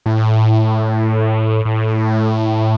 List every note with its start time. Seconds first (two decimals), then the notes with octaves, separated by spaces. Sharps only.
0.06 A2
1.65 A2